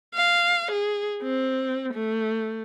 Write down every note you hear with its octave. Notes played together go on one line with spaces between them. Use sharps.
F5
G#4
C4
A3